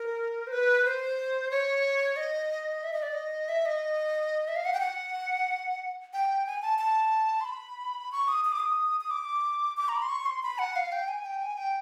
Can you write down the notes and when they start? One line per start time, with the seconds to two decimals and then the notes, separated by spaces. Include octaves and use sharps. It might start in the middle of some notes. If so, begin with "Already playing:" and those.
Already playing: A#4
0.47 C5
0.52 B4
0.85 C5
1.51 C#5
2.16 D#5
2.83 E5
2.93 D#5
3.02 D5
3.13 D#5
3.49 E5
3.65 D#5
4.48 E5
4.56 F5
4.65 F#5
4.73 G5
4.80 F#5
6.13 G5
6.46 G#5
6.62 A5
6.79 A5
7.41 C6
7.45 B5
8.12 C#6
8.28 D#6
8.45 D#6
8.52 D6
8.59 D#6
9.01 D#6
9.10 D6
9.77 D6
9.89 A#5
9.96 B5
10.02 C6
10.09 C#6
10.26 C6
10.43 B5
10.59 F#5
10.76 F5
10.92 G5
11.08 G#5
11.26 G5
11.42 G#5
11.58 G5